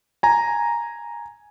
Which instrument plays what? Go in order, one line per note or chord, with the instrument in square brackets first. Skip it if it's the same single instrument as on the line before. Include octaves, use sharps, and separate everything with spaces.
[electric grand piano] G#5 A#5